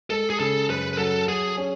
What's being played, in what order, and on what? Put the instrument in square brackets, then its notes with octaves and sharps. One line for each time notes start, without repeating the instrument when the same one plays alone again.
[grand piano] G#3 [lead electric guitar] A4
[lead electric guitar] G#4
[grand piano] C#3 [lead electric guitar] A4
[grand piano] F#2 [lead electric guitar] B4
[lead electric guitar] B4
[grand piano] F#3 [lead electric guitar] A4
[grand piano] F#3 [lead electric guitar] G#4
[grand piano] C#4